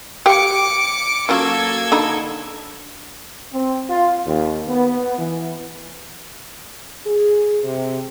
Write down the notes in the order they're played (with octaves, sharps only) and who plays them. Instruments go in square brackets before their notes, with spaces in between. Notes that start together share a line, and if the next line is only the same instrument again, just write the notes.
[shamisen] G4 F5 G5 [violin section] D6 C#7
[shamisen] F#3 C#4 F4 [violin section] A#3 A4 G#6
[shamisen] D3 D#4 B5
[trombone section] C4
F4
D#2
B3
E3
[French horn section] G#4
C3